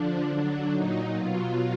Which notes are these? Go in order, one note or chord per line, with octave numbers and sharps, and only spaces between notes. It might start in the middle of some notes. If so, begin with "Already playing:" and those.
Already playing: D3 F3 D4
D3 F#3
A#2 F#3 D#4
B2 F#3 F4